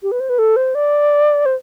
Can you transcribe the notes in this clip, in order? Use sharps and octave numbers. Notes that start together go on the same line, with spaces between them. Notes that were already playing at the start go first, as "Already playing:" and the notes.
G4
B4
C5
B4
A4
C5
D5
C5